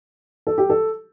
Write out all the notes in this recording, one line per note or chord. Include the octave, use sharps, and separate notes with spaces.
A4
G4
A4